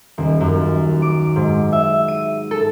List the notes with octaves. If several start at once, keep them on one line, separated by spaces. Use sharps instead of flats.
D#1
F#2
D6
G#2
E5
D#7
A4